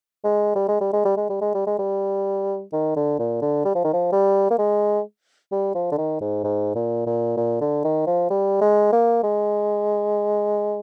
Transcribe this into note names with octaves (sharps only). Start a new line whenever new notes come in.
G#3
G3
G#3
G3
G#3
G3
G#3
G3
G#3
G3
G#3
G3
D#3
D3
A#2
D3
G3
F3
D#3
F3
G3
A#3
G#3
G3
F3
D3
D#3
G#2
G#2
A#2
A#2
A#2
D3
D#3
F3
G3
G#3
A#3
G#3